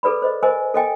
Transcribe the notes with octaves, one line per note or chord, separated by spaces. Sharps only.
G#4 A4 B4 D5 B5
C5 D#5
A#4 C5 D#5 G#5
A4 D#5 G5 G#5